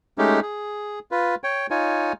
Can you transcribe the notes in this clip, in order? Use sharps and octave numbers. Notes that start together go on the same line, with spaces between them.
G#3 A3 C#4 D#4 G4
G#4
F4 B4
C#5 G5
D#4 F4 C#5 G#5